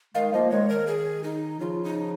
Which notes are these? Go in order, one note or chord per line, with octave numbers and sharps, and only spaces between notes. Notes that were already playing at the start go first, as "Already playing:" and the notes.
D#3 G#3 F5
F3 A#3 D#5
D#3 G#3 C#5
D#3 A#4
G#4
D#4
C#3 F3 F4
D#4